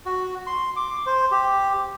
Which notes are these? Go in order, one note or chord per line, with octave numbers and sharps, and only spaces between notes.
F#4
C6
D6
C5
G4